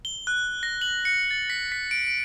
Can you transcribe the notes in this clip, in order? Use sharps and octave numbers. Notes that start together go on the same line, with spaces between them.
G7
F#6
A#6
F#7
C#7
A6
B6
B6
D7
D7